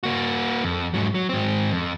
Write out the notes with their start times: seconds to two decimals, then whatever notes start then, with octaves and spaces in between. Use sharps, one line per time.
0.03 A#3 F#4
0.64 F2
0.94 G#2 F#3
1.14 F#3
1.29 G#2 C4
1.72 F2